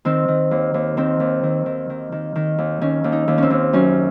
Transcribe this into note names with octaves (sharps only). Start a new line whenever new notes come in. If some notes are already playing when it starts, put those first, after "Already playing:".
D#3 C4
D#3
D#2
D#2
D#3 C4
D#2
D#3
D#3
D#3
D#3
D#3
D#2
D#3 C#4
D#2
D#4
D#2
C4 C#4
D#2
F#2 C#4